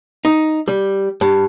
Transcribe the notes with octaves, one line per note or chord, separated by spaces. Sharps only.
D#4
G3
G2